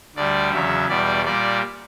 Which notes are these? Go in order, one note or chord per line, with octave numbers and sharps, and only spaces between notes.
D2 D3 G3 D5
E2 C#3 F#3 E5
E2 B2 G3 D5
A#2 G3 D5